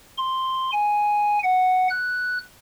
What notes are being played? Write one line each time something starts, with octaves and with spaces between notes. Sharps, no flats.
C6
G#5
F#5
F#6